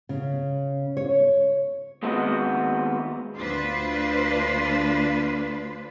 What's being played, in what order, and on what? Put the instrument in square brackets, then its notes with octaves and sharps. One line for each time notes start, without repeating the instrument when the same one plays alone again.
[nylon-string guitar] C#3
C#5
[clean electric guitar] D#2 G#3 B3 C4 F#4 D#5
[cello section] D2 D4 F4 B4 C5